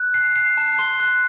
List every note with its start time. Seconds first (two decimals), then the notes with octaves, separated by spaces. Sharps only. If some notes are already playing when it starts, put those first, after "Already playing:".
Already playing: F#6
0.14 C7
0.36 C7
0.57 A5
0.79 C6
1.00 F#6